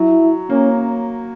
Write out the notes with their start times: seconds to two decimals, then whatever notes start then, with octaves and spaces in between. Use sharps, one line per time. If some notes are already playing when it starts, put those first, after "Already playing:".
Already playing: F#3 E4
0.50 A#3 C#4